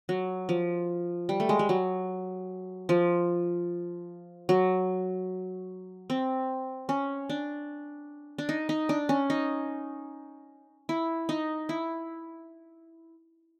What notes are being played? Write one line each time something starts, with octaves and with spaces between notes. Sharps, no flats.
F#3
F3
G3
A3
G#3
G3
F#3
F3
F#3
C4
C#4
D4
D4
D#4
D#4
D4
C#4
D#4
E4
D#4
E4